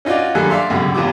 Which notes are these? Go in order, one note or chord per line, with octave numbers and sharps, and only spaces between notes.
C#4 D#4 F4 F#4 D5
F#2 D#3 G3 G#4 A4 F#6
D5 E5 F5 C6
C#2 F#2 B2 D3 G3
G#1 E2 F4 G4 D6